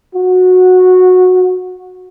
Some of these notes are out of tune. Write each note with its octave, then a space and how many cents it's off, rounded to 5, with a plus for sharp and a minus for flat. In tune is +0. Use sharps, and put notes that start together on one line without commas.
F#4 -15